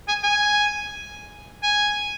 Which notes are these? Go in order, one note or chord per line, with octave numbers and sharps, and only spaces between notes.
G#5
G#5
G#5